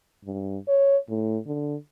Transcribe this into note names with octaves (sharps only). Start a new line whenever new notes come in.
G2
C#5
A2
D3